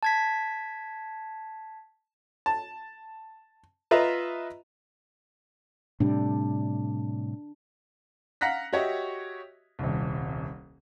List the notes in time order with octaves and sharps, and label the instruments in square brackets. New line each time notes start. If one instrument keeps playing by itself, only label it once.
[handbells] A5 G#6 B6
[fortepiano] A5
F4 B4 D#5 E5 A#5
[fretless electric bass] A2 C3 G3 [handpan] D4
[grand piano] F5 F#5 A#5 F#6 A#6 B6
F#4 G4 C#5 D#5 E5
D#1 C2